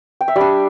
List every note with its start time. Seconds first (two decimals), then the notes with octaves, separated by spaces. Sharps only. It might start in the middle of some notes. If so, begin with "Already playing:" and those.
0.21 G5
0.28 E5
0.36 G3 D4 D5